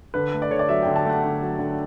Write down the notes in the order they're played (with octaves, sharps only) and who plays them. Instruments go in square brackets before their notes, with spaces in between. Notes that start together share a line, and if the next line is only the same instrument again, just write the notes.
[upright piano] D3 B4
A3
D5
D3 C#5
D5
F#3 E5
D3 G5
A5
A3 F#5
D3
F#3
D3